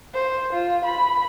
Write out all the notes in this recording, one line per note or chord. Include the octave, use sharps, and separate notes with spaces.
C5
F4
B5